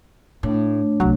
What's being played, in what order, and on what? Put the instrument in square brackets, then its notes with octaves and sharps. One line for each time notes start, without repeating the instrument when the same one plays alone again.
[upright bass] A2 [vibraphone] A3 D4 C#5
[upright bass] D1 C2 [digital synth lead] F#3